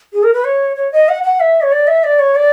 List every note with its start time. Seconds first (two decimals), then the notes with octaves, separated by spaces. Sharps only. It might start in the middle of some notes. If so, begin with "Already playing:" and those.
0.13 G#4
0.23 A#4
0.33 B4
0.44 C#5
0.76 C#5
0.92 D#5
1.09 F#5
1.23 F#5
1.40 E5
1.62 C#5
1.72 D5
1.87 E5
2.04 D5
2.19 C#5
2.35 D5